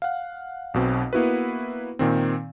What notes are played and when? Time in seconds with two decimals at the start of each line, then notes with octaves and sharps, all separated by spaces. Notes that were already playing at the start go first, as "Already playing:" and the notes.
0.02 F5 F#5
0.74 B1 B2 C4
1.13 A#3 B3 E4 F#4 B4
1.99 A#2 D#3 C4